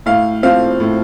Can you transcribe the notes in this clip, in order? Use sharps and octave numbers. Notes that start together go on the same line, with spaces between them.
A2 F5
F3 C4 F5
A2